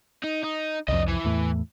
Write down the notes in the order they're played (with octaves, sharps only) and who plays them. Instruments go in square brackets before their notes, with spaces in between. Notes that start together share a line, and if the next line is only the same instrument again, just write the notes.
[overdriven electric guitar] D#4
D#4
[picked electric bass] C2 F2 [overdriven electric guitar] D4 D#5
[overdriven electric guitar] E3
[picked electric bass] E2 A2